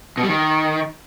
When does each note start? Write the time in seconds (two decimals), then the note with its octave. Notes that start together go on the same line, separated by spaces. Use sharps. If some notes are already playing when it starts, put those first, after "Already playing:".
0.17 B2
0.23 G3
0.29 D#3